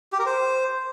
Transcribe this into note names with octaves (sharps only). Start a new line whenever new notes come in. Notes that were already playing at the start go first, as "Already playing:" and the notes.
G4
A#4
C5